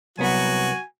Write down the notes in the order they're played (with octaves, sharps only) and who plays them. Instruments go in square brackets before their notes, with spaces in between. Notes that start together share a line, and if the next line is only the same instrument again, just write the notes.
[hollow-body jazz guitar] C2 B3 [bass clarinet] F#3 [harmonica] F#4 [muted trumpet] G#5